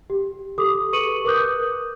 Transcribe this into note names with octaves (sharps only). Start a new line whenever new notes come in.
G4
G4 A4 D6 D#6
G#4 B4 C#6 C#7 D#7 F#7
A#4 B4 D6 D#6 F#6 G6